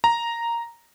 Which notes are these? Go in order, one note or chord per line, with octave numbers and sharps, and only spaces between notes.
A#5